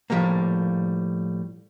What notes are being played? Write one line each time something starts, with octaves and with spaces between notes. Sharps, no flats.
A2 F3 G3 G#3 A#3